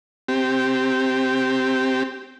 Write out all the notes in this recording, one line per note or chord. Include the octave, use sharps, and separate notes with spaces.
C4 G4